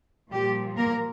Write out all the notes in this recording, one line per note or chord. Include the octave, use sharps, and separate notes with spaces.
A#2 F3 G3 G4
A#3 A#4